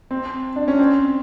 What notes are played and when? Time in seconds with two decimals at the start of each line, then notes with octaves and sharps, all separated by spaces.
0.11 C4
0.56 D4
0.68 C#4
0.79 C4